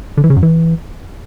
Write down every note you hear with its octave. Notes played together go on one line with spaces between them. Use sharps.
D3
E3
C#3
F#2
E3